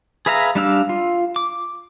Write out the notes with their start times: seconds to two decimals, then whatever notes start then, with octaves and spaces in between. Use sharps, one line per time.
0.26 G#4 B4 E5 F5 A#5
0.55 G3 D4 F5 E6
0.89 F4
1.36 D6